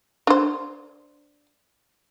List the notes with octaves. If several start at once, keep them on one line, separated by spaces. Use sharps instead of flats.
D4 C5